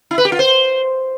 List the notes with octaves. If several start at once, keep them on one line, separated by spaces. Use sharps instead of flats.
E4
B4
G4
F4
C5